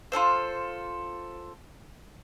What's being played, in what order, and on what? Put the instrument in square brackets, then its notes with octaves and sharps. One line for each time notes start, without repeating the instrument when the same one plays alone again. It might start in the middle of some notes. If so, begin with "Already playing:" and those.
[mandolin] F4 F#4 A4 C5